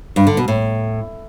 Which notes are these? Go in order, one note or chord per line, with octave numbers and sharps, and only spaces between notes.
G2
D3
B2
A2